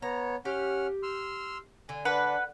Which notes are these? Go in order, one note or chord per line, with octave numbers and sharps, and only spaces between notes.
B3 C#5 A#5
C#4 G4 F#5 F6
C6 E6 F6
D3 G#5
D4 B4 F#5